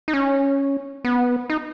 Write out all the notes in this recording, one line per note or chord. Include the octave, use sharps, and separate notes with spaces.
D#4
C#4
B3
D#4